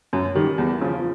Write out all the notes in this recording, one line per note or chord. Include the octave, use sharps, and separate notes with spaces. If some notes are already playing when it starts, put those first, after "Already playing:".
F#2
D#3 G3
E2
C#3 F3